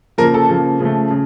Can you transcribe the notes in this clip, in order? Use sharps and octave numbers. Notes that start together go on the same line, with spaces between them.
C#3 F3 A#3 A#4
A4
C#3 F3 A#3
C#3 F3 A3
C#3